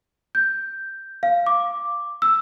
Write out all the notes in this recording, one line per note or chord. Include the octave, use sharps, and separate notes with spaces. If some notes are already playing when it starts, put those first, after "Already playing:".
G6
F5
D6
E6